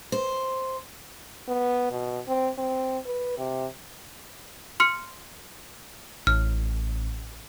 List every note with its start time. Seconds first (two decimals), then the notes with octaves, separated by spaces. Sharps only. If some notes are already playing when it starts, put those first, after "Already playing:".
0.12 C5
1.48 B3
1.92 B2
2.28 C4
2.58 C4
3.06 B4
3.38 C3
4.80 C6 F6 C#7
6.27 A1 F6